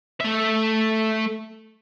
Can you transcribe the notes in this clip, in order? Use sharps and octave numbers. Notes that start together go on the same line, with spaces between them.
A3 E5